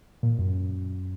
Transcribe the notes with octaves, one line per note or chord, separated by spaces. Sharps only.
A#2
F#2